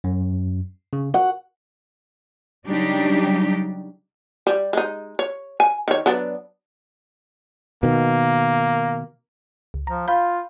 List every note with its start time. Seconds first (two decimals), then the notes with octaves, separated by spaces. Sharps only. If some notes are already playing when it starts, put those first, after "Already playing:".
0.04 F#2
0.93 C#3
1.14 F#4 F#5
2.67 C#3 F#3 G3 D4 D#4 G4
4.47 G3
4.73 G#3 D#4
5.19 C#5
5.60 G#5
5.88 D#3 C#5
6.06 F#3 B3 D4
7.83 B2 D#3 A#3
9.74 C#2
9.87 F3 A#5
10.08 F4 F5 B5 G6